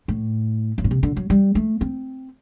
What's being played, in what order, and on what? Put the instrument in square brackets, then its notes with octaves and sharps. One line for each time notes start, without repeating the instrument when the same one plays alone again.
[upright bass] A2
F#2
A#2
C3
D3
F#3
G3
A3
C4